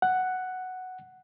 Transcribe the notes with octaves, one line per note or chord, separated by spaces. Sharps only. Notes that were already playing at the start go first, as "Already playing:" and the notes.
F#5